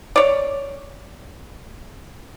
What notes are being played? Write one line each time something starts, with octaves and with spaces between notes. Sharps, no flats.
C#5 D5